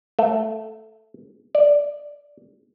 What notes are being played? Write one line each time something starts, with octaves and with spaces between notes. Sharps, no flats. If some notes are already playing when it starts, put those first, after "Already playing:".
A3
D5